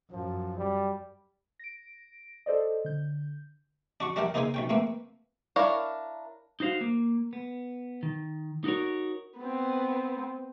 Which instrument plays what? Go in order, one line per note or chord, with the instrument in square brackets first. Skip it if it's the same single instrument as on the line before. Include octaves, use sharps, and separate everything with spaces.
[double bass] F#2 [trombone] F3
[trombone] G3
[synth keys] A#6 D7
A4 C5 D5 D#5
D3 G6
[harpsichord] D4 F#4 C#6
G3 D4 E4 A#4 F#5 G5
A#3 D#4 G#4 C5 E5 G#5
B1 C#4 G5
A3 A#3 C4 B4
[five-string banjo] D4 E4 A#4 C#5 F5
[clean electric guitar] D#4 F#4 C5 F5
A#3
B3
D#3
D#4 F#4 A4 A#4 C#5
[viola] B3 C4